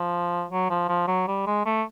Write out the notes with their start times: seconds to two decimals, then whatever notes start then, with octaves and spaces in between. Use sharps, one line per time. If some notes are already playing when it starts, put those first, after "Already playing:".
Already playing: F3
0.50 F#3
0.70 F3
0.89 F3
1.07 F#3
1.27 G3
1.47 G#3
1.66 A3